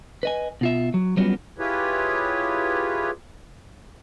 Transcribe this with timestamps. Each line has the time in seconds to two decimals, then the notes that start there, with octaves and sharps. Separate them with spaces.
0.23 B4 D#5 G#5
0.61 B2 F4 E5
0.94 F#3
1.17 F#3 G3 B3 C#4 F4 F#4
1.58 E4 F4 G4 G#4 B4 C#5